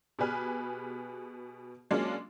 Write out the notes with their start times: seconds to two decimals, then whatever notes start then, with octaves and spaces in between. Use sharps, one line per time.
0.19 B2 G4 G#4 B4 G#5 F6
1.91 F#3 G#3 A#3 C#4 D4 F4